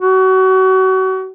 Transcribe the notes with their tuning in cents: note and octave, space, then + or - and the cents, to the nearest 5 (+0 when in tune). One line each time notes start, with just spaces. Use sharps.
F#4 +30